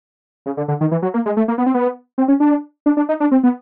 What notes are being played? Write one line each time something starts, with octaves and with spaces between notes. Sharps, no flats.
C#3
D3
D3
D#3
E3
F#3
A#3
G#3
A3
A#3
B3
C4
B3
C4
C#4
D4
D4
D4
D#4
D4
C4
B3